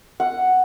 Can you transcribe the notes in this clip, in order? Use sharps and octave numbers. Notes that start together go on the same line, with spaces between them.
F#5